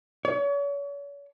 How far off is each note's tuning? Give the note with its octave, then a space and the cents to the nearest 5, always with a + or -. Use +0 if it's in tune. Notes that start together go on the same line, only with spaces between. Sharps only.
C#5 +40